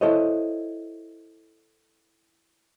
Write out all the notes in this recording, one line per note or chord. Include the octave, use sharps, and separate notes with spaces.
E4 A4 C5 C#5 D#5